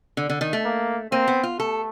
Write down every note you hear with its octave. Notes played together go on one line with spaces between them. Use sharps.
D3
D3
D#3
A3
A#3
A#3 C4
B3
F4
A3 A4